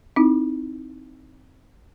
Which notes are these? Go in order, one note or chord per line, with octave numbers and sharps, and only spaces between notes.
C4 D#4 E4